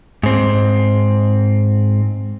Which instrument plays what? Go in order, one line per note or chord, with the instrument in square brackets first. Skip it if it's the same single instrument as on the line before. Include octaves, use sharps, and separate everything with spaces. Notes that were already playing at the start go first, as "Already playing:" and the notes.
[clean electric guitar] G#2 C4